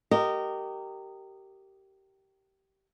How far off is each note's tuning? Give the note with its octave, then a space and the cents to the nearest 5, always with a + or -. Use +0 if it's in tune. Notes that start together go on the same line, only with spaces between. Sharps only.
G4 -20 A#4 -20 D#5 -15